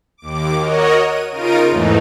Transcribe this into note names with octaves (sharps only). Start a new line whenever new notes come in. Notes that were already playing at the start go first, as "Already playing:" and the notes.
D#2 D6
F#4 A#4 C#5 D#5
D#7
C#3 D#4 F4 A#4 D7 D#7
E2 G#2 E3 A3 D#4